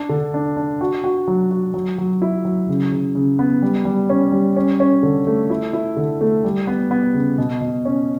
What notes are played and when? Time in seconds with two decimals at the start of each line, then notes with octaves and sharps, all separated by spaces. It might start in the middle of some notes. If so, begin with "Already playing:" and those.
Already playing: D4
0.09 D3
0.34 D4
0.57 D4
0.81 F#4
1.04 F#4
1.28 F#3
1.51 F#4
1.74 F#3
1.98 F#3
2.22 E4
2.45 F#3
2.69 C#3
2.92 C#3
3.15 C#3
3.39 B3
3.62 G3
3.85 G3
4.09 C#4
4.32 G3
4.56 C#4
4.80 C#4
5.03 D3
5.27 A3
5.50 E4
5.73 E4
5.96 D3
6.21 A3
6.44 G3
6.67 B3
6.91 B3
7.14 C#3
7.38 B2
7.61 B2
7.85 C#4